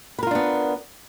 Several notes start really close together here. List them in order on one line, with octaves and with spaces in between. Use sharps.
B4 A#4 F4 D4 B3